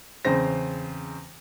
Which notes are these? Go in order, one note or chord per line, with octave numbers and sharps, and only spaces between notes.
E2 C#3 C4 C5 A#6